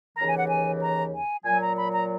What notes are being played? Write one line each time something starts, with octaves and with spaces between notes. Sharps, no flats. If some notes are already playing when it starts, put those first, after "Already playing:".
D#2 C#3 E3 A#5
G#5
F#5
G#5
A#5
G#5
A#2 F#3 G#5
A#5
B5
A#5